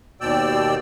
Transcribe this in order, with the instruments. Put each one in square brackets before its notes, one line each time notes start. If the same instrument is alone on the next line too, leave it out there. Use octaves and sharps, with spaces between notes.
[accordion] D#2 B2 D5 G5 E6